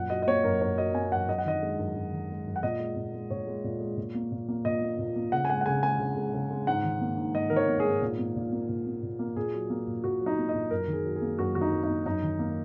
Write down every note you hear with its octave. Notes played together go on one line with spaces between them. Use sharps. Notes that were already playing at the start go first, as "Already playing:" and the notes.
Already playing: F#2 A#2 F#5
F#3 D#5
D#5
A#3 C#5
F#2 A#4
F#2 C#5
F#3 D#5
A#3 G#5
F#2 F#5
F#2 D#5
F#5
D#3 D#5
G#3
F#2
F#2
D#3
G#3
F#2
F#5
A#2 D#5
G#3
A#2
G#3
A#2 C#5
G#3
A#2
G#3
A#2
A#3
A#2
A#3
A#2 D#5
A#3
A#2
A#3
C#3 F#5
G#5
G#3 F#5
F#5
C#3 G#5
G#3 G#5
C#3
G#3
C#3
G#3
G#2 F#5
D#3
A#3
G#2
G#2 D#5
D#3 A#4
C#5
A#3
G#4
G#2
A#2
A#3
A#2
A#3
A#2
A#3
A#2
A#3
A#2 G#4
F#3
A#3
A#2
A#2 F#4
F#3
D#4
A#3
D#5
A#2
F#2 A#4
D#3
G#4
F#3
G#4
A#3
F#2 F#4
D#3 F#4
D#4
F#3
D#4
A#3
F#2 D#4
D#3
A#3